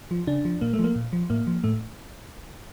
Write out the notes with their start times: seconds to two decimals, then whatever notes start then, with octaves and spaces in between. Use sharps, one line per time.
0.11 F3
0.27 C#3 D4
0.45 F3
0.61 A#2 A#3
0.73 A3
0.79 F3
0.84 A#3
0.96 A#2
1.13 F3
1.30 A2 A#3
1.47 F3
1.64 A2 A3